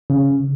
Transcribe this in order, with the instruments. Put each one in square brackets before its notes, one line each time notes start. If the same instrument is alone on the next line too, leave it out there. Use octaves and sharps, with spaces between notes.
[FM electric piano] C#3